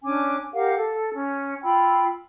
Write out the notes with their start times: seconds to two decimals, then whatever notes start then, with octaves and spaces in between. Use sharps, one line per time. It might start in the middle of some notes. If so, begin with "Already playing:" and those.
0.04 C#4 D4 G#5 D6
0.53 G4 A#4 F5 F#5
0.77 A4
1.14 C#4
1.63 F4 G5 B5 E6